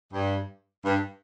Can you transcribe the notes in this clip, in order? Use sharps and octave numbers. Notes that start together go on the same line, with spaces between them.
G2
G2